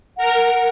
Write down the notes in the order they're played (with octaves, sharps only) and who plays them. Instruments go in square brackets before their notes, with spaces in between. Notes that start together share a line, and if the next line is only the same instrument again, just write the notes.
[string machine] A#4 [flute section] F#5